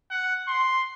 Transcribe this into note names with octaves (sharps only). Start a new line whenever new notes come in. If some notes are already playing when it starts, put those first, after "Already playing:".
F#5
C6